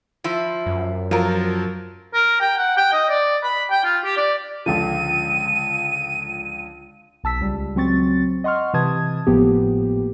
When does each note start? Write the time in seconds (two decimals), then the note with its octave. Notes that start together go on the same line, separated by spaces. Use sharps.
0.24 F3 E4
0.66 F#2
1.11 F3 F#3 F4 A#4
2.14 A#4
2.41 G5
2.58 F#5
2.77 G5
2.93 D#5
3.10 D5
3.43 B5
3.71 G5
3.84 F4
4.04 G4
4.17 D5
4.66 C#2 D3 F3 D#7
7.24 B1 A5 E6 B6
7.40 C#2 G3
7.75 C#2 F#3 C4 C#6 A6
8.44 D#5 F#5 C6 C#6 F6
8.74 C3 E3 B4 A5 D#6 G#6
9.27 G#1 A2 F3 A#3 B3 G4